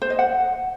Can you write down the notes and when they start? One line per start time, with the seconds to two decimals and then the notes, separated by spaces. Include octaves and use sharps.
0.02 C5
0.10 D#5
0.19 F#5